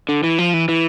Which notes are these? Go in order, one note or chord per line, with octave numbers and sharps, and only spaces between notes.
D3
E3
F3
E3
E3